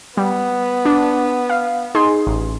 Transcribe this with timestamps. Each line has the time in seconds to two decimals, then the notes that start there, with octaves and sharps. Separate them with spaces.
0.17 G3 B3
0.85 D4
1.50 F5
1.95 D#4 G#4 C6
2.27 A1